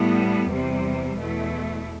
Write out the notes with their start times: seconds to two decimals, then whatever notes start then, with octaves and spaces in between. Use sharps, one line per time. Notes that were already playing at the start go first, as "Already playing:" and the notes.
Already playing: A2 G3 B3
0.51 E2 C3 G3
1.18 E2 B2 A3 E4